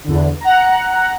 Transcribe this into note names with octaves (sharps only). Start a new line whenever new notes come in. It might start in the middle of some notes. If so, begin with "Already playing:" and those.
E2 D3
F#5 A#5